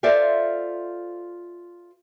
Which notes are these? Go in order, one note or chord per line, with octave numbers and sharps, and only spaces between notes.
F4 A4 C5 D5 E5 F5